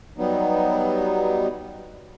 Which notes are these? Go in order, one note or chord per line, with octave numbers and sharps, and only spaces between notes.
F#3 G3 B3 D#4